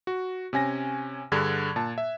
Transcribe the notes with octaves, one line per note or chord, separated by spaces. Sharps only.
F#4
C3 C#4 G#5 A#6
G2 D3 D4 G#4 F#6 G#6
A#2 A5
E5